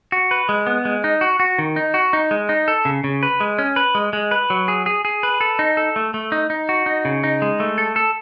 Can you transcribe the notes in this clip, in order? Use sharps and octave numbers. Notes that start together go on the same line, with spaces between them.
F#4
B4
G#3
B3
G#3
D#4
F#4
F#4
D#3
D#4
F#4
D#4
G#3
D#4
A4
C#3
C#3
B4
G#3
C#4
B4
G#3
G#3
B4
F#3
G#4
G#4
G#4
B4
A4
D#4
A4
A3
A3
D#4
D#4
F#4
D#4
C#3
D#4
G#3
A3
A4
A4